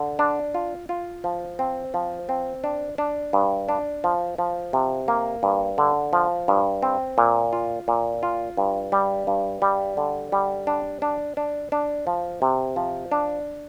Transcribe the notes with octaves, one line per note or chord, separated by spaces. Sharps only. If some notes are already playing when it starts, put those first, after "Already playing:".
Already playing: D3
D4
F4
F4
F3
C4
F3
C4
D4
D4
G2
D4
F3
F3
C3
A#3
G2
D3
F3
G2
C4
A#2
F4
A#2
F4
G2
G3
G2
G3
D3
G3
D4
D4
D4
D4
F3
C3
F3
D4